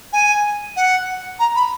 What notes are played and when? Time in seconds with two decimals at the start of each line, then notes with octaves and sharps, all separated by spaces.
0.13 G#5
0.76 F#5
1.39 A#5
1.55 B5